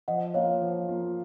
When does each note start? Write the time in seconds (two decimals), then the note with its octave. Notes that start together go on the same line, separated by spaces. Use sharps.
0.08 F3 D#5 F#5
0.34 A#3 F4 C#5 F5
0.62 F3
0.88 A#3 F4